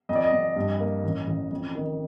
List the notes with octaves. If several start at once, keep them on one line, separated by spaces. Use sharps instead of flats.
F2 D#5
D5
D#5
F2
G2
A#3
A1
A1
F2
D#3